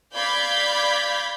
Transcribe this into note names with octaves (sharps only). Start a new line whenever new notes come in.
D5 F5 B5 G6 G#6 B6